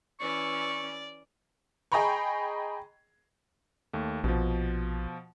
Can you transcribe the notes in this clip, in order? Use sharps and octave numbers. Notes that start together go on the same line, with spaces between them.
E3 C#4 D5 C#6
G#4 D#5 G5 A#5 B5 C#6
D#2 A3
A#1 B2 F3